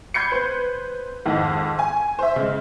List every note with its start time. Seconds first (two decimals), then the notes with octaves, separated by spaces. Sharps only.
0.14 B5 G6 G#6 C7 C#7
0.31 B4 C5
1.26 F2 G#2 D#3
1.79 G#5
2.19 C5 E5
2.36 C#3 G#3